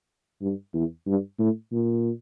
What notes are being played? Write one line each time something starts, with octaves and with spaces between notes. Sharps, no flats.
G2
E2
G2
A2
A#2